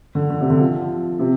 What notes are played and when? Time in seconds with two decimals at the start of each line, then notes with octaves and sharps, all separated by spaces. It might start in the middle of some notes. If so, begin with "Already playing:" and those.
0.15 D3
0.30 D3
0.41 C3
0.50 D3
0.60 F3
1.19 C3